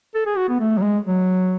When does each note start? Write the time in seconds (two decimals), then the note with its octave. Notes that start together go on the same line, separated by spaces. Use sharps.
0.15 A4
0.26 G#4
0.37 F#4
0.49 B3
0.60 A3
0.77 F#3
0.82 G#3
1.05 F#3